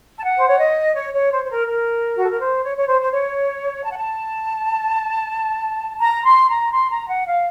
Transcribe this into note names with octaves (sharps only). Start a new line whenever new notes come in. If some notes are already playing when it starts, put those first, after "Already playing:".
A5
F#5
C5
C#5
D#5
C#5
C#5
C5
C5
A#4
A#4
F#4
A4
A#4
C5
C#5
C#5
C5
C5
C#5
A5
F#5
A5
A#5
C6
A#5
C6
A#5
F#5
F5